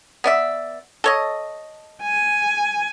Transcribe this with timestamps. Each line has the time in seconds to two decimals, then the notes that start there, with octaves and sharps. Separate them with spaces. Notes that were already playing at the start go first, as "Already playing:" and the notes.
0.24 B3 D5 E5
1.04 A4 C#5 D#5
2.03 G#5